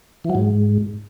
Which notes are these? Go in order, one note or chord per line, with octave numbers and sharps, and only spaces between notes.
E3
F#3
G#2